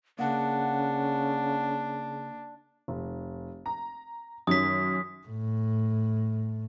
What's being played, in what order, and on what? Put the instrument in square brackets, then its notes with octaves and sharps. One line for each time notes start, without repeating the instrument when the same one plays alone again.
[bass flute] C#3 [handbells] A#3 [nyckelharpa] D4 [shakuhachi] F#5
[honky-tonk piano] F1
A#5
[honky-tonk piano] F#2 D#3 C#4 [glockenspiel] D#6 B6
[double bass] A2